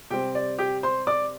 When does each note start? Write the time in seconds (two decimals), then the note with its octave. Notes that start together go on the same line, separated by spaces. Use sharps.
0.10 C3 G3 C4 G4 G5
0.35 D5
0.59 G4 G5
0.83 C5 C6
1.07 D5 D6